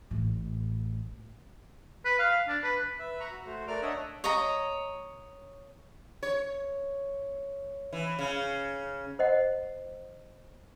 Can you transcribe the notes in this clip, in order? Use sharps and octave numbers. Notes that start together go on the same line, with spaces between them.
A1 A2
B4
F5
D4
B4
B4 E5
A#5 B5 C#6
F#4
A3 F#4 C5
A3 A#4 D5 D6 F6
D4 C#5 D#5 E5 F#5
C#5 D#5 A#5
C#5
E3
C#3
C5 D#5 F#5